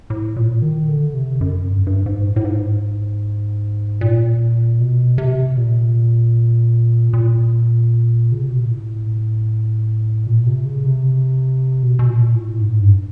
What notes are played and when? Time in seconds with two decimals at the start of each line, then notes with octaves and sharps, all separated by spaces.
0.10 A2
0.36 A#2
0.62 D#3
0.89 D3
1.14 C3
1.41 F#2
1.67 G2
1.87 G2
2.06 G#2
2.25 A2
2.36 A2
2.44 G#2
4.01 A#2
4.80 B2
5.18 C3
5.57 A#2
7.13 A#2
8.32 C#3
8.42 C3
8.50 B2
8.60 A#2
8.70 A2
10.27 A#2
10.46 C3
10.66 C#3
10.85 C3
11.83 B2
11.99 B2
12.09 A#2
12.35 A2
12.61 G#2
12.81 G2